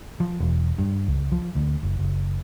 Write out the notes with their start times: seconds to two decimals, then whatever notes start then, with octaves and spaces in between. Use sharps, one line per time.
0.20 F3
0.40 E1
0.78 G2
1.08 C#2
1.32 F3
1.55 D2
1.83 F#1
1.99 F#1